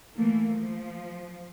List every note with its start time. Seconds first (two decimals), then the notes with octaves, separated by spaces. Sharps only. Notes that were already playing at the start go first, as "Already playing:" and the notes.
0.14 E3 A3 A#3
0.56 F3